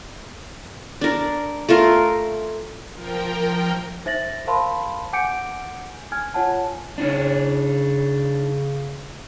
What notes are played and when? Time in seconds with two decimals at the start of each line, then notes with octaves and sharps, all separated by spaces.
1.01 D4 A#4
1.69 A3 F4 A#4
2.94 F3 A#4 G5
4.06 D#4 C5 E5 A6 A#6 F#7
4.47 A#4 C5 F5 A5 B5 C6
5.13 F#5 G#5 D6 G6 C#7 D7
6.12 G#5 F6 G#6
6.34 F4 C#5 F#5 G#5 A5
6.98 C#3 D4 D#4 C#5